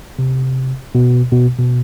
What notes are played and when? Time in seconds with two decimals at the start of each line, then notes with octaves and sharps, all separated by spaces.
0.19 C3
0.95 B2
1.32 B2
1.59 B2